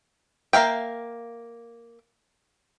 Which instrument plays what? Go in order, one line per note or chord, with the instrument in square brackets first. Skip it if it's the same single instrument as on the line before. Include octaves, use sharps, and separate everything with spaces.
[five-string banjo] A#3 E5 F5 G5